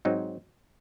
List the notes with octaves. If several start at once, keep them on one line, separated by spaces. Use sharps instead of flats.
G#2 F#3 C4 D#4